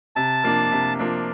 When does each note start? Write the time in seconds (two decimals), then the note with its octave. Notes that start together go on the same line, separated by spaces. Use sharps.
0.16 C3 A5
0.44 F3 A#3 D4
0.72 C3
0.99 F3 A#3 D4